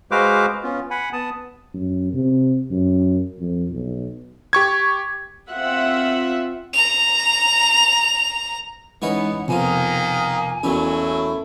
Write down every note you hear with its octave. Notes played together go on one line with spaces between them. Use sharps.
G#3 F#4 B4 C5 F5 D6
B3 C#4 F4
F#5 G#5 B5
B3 A5 D#6
F#2
C3
F#2
F2
B1
G4 C#6 G#6
C4 F4 E5 F#5
A#5 F7
E3 G#3 B3 C#4 D#4 B4 D#5 F#5
F2 C3 D#3 A#3 B3 F4 G#5
E2 B2 F#3 A3 A#3 C#4 E4